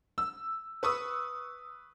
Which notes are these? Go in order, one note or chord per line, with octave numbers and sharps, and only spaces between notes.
E6
B4 C#6 D#6 E6